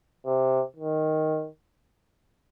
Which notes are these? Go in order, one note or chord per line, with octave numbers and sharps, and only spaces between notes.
C3
D#3